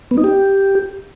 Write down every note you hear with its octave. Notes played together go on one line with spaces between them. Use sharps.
B3
D#4
G4